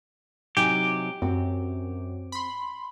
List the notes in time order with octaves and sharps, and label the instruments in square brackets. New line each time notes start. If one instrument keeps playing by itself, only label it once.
[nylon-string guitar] C3 F#3 D#4 [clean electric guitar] G4 [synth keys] G#5
[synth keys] F#2 [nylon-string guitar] C4 F#4
[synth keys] B5 C6